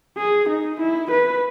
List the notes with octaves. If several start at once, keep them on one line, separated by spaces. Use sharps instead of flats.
G#4
D#4
E4
B4